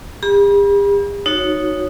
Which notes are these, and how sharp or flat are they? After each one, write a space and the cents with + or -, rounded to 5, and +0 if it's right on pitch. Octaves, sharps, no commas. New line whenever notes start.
G4 +45 B5 -35
D#4 -5 F#4 -10 C#5 +0